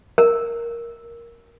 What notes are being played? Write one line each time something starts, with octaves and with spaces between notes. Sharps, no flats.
A#4